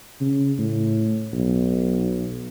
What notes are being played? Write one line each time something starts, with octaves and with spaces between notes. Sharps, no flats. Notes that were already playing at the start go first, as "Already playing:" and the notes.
C#3
A2
B1